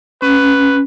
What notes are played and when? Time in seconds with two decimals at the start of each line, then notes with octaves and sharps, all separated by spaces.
0.22 C#4 B4